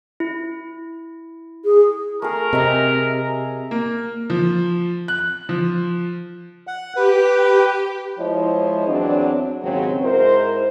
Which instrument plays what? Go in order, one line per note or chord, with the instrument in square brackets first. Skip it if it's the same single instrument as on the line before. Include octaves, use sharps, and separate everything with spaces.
[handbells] E4
[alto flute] G#4
[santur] A3 G#4 [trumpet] A#4
[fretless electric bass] C3 [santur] D#5 E5 A#5
[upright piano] A#3
F3
F#6
F3
[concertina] F#5
[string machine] G4 [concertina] B4
[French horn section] F3 G#3 E4 C5 C#5 D#5
E2 F#3 C4 D4
D#2 G#2 C#3 F#3 C4
G#2 E4 A#4 C5